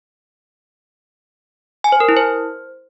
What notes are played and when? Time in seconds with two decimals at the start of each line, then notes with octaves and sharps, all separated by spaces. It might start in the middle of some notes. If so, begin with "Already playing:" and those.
1.84 G#5
1.92 C5
2.00 A#4
2.09 E4
2.17 C5